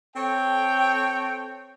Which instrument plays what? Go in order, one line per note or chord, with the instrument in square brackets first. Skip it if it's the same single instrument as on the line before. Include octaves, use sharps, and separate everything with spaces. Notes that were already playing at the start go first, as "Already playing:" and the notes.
[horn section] C4 A4 C#5 G5